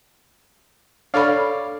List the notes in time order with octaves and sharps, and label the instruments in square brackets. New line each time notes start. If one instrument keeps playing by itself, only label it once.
[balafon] D4 A4 B5 [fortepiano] C#5 D5 F5